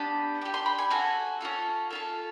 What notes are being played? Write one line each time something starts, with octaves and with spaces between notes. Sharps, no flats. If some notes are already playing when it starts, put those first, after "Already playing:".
Already playing: B3 D4 G4
D4 G4
C6
B5
G#5
C#4 F#4 A4 G#5
C#4 F4 A4
C#4 F4 A4